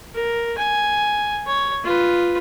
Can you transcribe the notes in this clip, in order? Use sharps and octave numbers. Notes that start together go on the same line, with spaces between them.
A#4
G#5
C#5
F4 B4